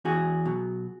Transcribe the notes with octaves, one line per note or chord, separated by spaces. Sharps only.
E2 F#4 G#4
B2 F#3